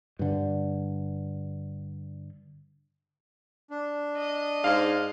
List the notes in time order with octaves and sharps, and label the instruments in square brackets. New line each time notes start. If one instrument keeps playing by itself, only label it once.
[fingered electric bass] G2 D3
[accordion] D4
[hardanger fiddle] D#5
[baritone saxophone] G#2 [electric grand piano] F5